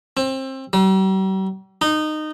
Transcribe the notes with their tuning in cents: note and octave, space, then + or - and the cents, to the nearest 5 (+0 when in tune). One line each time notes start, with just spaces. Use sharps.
C4 +25
G3 -45
D#4 -20